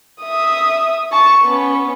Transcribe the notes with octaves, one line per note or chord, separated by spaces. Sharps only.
E5 D#6
A5 C#6
B3 C#4